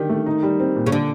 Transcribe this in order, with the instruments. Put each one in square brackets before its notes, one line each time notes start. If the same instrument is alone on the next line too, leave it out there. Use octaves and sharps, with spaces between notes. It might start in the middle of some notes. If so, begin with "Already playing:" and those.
Already playing: [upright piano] D3 D4 G4 [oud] D#3
[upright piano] A3
D#4
G3
C4
A#2
[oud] C#3
[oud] D3 [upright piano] D4